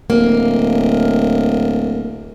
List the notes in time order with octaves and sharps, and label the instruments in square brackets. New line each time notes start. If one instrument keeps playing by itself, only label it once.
[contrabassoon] D1 [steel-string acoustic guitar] A#3